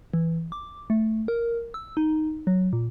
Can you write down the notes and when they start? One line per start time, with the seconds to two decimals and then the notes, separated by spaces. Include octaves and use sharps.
0.14 E3
0.52 D6
0.90 A3
1.28 A#4
1.74 E6
1.97 D#4
2.47 F#3
2.73 A#2